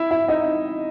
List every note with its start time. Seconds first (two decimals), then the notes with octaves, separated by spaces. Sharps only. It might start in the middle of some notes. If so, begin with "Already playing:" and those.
Already playing: E4 E5
0.11 E4 E5
0.28 D#4 D#5